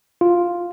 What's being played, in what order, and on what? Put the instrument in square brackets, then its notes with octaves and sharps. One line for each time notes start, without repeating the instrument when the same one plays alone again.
[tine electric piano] F4